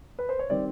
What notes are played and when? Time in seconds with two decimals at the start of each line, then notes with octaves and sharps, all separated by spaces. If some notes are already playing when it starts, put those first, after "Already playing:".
0.19 B4
0.29 C5
0.39 C#5
0.50 D#3 G3 C4 D5